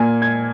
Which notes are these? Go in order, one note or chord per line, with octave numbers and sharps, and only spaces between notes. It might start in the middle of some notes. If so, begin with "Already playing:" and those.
Already playing: A#2 A#3 G#5
G#6